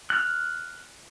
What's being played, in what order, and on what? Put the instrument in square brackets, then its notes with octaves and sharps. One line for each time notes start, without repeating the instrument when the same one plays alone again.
[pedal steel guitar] F6 F#6